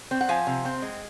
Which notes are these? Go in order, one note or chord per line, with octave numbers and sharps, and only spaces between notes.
C4
F#5
F3 F5 G#5
C3
C4
G#3